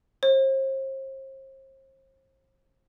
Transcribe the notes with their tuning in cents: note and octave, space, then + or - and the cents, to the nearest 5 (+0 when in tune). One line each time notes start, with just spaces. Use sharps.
C5 +40